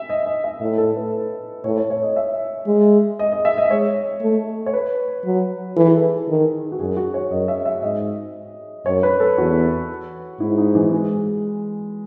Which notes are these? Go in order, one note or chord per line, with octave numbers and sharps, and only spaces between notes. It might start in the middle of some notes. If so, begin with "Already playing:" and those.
Already playing: E5
D#5
D#5
E5
A2
A4
B4
A2 C#5
C#5
C#5
D#5
E5
G#3
D#5
D#5
E5
D#5
G#3 C#5
A3
C#5
B4
F#3
E3 A4
G#4
A4
D#3
F#4
F#2 G#4
F#4
C#5
F#2 D#5
E5
E5
G#2 D#5
F#2 C#5
B4
A4
E2 F#4
G#2 E4
D#4
E3
G#3